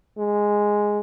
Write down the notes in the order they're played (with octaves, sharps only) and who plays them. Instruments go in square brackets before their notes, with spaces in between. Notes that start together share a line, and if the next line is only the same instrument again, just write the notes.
[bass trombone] G#3